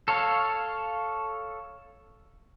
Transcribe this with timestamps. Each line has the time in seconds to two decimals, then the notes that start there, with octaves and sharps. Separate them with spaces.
0.08 A4 C#5 F5